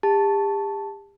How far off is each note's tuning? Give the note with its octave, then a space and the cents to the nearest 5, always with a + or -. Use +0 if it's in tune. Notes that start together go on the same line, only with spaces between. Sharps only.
G4 +40 A5 +0